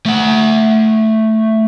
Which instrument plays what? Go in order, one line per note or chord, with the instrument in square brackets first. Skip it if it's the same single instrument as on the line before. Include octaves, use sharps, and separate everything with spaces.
[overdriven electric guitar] A3 F#5